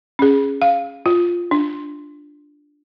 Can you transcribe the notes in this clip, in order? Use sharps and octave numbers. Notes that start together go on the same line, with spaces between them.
C#4 G#4
F5
F4
D4